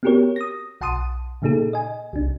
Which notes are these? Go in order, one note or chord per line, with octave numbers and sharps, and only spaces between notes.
B3 C4 F#4 G4 A#4 C#5
D#6 A#6
B1 F#5 A5 C6 D#6 D#7
A#2 C#3 A#3 D#4 G#4 A4
D#5 G#5
C2 D4